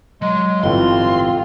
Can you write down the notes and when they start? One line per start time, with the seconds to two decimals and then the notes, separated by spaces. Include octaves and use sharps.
0.22 F#3 G#3
0.63 G1 A2 E3 C4 F4 C6